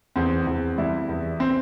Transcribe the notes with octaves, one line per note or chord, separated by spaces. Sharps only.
E2 C4
E2
G3 E4
E2
C4